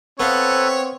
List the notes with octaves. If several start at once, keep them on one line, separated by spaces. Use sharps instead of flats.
B3 C4 A4 B4 C#5 F5